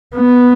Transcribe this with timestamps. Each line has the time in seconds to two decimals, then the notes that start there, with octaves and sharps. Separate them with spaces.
0.16 B3